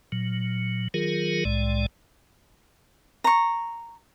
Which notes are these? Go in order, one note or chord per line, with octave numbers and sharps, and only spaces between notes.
A#2 F#3
D#3 F#3 F4 G#4 A#4
C2 A2 G#3 D5
A#5 C#6